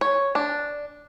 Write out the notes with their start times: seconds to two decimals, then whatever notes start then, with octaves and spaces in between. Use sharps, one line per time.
0.01 C#5
0.35 D4